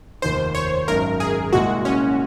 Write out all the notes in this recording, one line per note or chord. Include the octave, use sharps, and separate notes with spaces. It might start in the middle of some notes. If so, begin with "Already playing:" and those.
F1 D#2 D#3 C5
C#5
G#1 F#2 D#3 F#3 A#4
G#4
C2 A#2 G#3 F#4
C#4